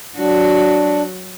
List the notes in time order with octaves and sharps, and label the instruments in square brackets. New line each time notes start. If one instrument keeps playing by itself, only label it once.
[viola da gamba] F#3 F#4 [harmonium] D4